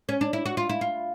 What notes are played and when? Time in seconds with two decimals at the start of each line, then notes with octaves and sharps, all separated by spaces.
0.09 C#4
0.21 D4
0.33 E4
0.46 F#4
0.57 F4
0.69 E4
0.81 F4